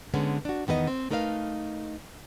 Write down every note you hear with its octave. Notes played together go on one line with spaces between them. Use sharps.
D3 G#3 B3 C#4
D4 F#4
E2 D#3 B3 G#4 D#5
C4
A3 D#4 A#4 B4 E5 F5